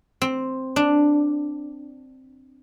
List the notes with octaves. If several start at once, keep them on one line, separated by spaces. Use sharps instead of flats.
C4
D4